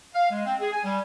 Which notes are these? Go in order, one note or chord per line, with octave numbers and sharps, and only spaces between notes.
F5
G#3
C4
G#4
G#5
G3